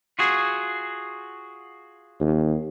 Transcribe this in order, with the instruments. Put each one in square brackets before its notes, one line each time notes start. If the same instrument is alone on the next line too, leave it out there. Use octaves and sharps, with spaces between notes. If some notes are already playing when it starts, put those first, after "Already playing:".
[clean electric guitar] F4 F#4 G#4
[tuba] D#2